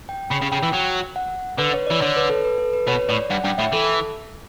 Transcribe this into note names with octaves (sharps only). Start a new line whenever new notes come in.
G5
C#3 B5
C#3
C#3 G5
E3
F#3
F#5
D3 B4
C#5
D5
E3
D3 C#5
B4
A4
B4
A4
B4
B2 C#5
A2 D5
G2 F#5
G2 G5
A2 E5
E3 A4